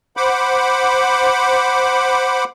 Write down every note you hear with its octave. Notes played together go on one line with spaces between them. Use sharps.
C5 F#5 B5 D6